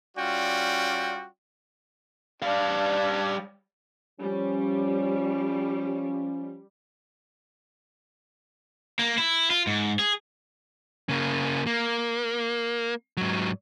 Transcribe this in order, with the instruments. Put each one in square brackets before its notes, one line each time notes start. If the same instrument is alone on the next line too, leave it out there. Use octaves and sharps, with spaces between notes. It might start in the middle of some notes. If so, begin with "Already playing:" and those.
[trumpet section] G3 C#4 F4 F#4 D5 G5
[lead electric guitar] G3 F5 [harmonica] D4
[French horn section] F3 C#4 [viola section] G3
[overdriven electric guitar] A#3
E4
F4
G#2
G#4
[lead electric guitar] C#3 A#3
A#3
G#2 F#3